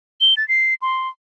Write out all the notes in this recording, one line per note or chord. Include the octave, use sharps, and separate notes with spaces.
G7
A6
C7
C6